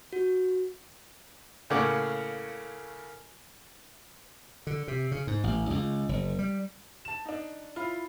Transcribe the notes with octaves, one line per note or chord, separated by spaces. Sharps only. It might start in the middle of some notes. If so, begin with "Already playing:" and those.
F#4
A2 C#3 A#3 C#5 F#5 D6
D3
C3
C#3
G#2
A1
C#2
F#1
G3
A5 E7
D4 D#4
E4 F4